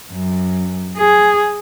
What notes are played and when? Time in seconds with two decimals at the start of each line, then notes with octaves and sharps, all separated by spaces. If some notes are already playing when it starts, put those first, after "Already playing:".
0.12 F#2
0.97 G#4